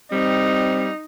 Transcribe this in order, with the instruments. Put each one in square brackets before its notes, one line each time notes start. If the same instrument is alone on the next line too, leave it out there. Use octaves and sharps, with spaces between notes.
[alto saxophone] G3 [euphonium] C4 [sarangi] D#4